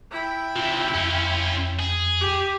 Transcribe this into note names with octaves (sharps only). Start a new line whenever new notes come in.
E4 G5
D#2 C3 F4
F2 C#4 F4
G#4
G4